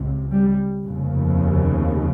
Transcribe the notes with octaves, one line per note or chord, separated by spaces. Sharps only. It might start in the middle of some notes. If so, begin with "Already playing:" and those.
Already playing: C#2 C3
G3
F1 D#2 C#3